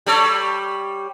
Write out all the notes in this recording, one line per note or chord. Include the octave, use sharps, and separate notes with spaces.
G3 A4 C#5